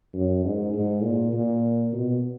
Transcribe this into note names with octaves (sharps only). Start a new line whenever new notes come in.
F#2
G#2
G#2
A#2
A#2
B2